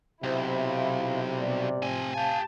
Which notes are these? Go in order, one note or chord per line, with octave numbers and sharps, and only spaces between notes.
B1 C3 E4 C5
F5
B2 G3 D5
A2 F3 C4 G#5
G4 F5 G#5 A5